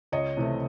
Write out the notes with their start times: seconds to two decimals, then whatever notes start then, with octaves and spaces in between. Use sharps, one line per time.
0.12 C#2 C#5 D#5
0.37 C3 E3 A3